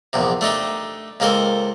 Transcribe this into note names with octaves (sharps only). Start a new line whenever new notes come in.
A#1 E2 C3
A3 D4 D#4 G4
C#2 A#3 C4 A4 C5